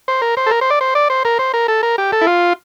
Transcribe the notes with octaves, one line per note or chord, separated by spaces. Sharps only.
C5
A#4
C5
A4
A#4
C5
D5
C5
D5
C5
A#4
C5
A#4
A4
A#4
G4
A4
E4
F4